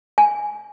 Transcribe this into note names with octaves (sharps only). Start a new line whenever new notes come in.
G#5